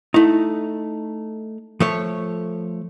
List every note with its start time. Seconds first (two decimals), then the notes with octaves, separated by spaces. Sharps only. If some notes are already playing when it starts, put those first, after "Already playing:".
0.14 A3 D#4 E4
1.80 F3 A3 C#5